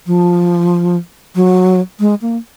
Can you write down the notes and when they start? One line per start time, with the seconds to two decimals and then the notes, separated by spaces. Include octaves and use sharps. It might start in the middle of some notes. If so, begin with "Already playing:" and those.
0.06 F3
1.35 F#3
2.00 G#3
2.21 A#3